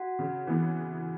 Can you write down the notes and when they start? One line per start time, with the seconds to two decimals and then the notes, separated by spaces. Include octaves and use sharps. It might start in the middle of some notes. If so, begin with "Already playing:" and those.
Already playing: F#4 F#5
0.19 C#3
0.47 E3 B3